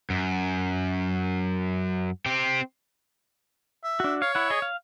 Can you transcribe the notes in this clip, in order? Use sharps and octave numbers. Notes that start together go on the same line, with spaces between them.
F#2
C4 G4
E5
D4 F#4
C#5 F5
E4 F#5
G#4 D#5
F5